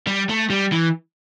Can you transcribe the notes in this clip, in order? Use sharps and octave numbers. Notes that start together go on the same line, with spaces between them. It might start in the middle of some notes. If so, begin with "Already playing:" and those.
G3
A3
G3
E3